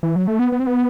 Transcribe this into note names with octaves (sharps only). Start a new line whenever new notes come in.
E3
F#3
A3
B3
B3
C4
B3